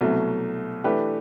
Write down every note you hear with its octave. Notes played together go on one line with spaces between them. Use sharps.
C2 B2 F#3 A3
E3 A3 D4 G4 B4